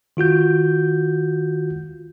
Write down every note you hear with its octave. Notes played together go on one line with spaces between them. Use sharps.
D#3 F4 F#4 G6